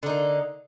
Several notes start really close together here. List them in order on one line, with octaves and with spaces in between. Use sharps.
D3 D#4 A#3